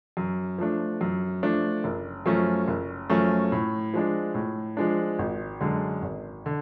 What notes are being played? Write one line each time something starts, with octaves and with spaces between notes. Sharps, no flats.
F#2
F3 A3 D4
F#2
F3 A3 D4
F#1
F#2 F3 A3 C#4
F#1
F#2 F3 A3 C#4
A2
F3 G#3 D4
A2
F3 G#3 D4
G#1
F#2 D3 G#3
G#1
D3